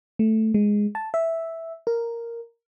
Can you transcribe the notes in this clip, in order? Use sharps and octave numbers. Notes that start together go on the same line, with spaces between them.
A3
G#3
A5
E5
A#4